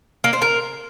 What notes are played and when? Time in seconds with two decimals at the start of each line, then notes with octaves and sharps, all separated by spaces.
0.24 A#3
0.33 C5
0.42 A#4